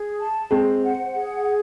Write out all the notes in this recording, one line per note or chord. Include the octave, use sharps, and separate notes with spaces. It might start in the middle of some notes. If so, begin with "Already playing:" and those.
Already playing: G#4
A5
G#3 C4 C5
F#5
G#4